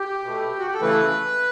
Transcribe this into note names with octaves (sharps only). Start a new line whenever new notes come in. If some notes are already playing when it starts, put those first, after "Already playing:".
Already playing: G4
B2 A3
F#4
G4
A4
C#3 E3 A3 B4